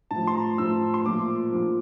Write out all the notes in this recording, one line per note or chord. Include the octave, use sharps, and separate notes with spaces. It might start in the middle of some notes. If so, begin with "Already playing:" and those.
A2 A5
F3
C6
A#5
A2 F3 E6
C6
A#2 F3 D6
A#2 F3